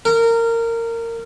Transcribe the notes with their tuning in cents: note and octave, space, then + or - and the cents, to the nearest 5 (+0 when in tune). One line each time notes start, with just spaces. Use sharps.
A#4 -20